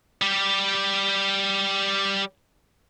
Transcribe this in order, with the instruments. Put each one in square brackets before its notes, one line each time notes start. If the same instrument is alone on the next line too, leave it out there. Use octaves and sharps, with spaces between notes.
[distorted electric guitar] G3 G4